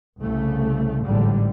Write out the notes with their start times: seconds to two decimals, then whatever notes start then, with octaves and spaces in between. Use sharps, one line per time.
0.21 C2 C#3 A3
1.02 A1 G#2 D3 G3